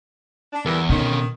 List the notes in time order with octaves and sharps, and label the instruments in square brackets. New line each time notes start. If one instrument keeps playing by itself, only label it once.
[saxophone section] D4
[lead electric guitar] E2 [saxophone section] E3 G3 A#4
[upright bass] B2 [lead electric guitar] D3 C#4 [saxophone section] D#3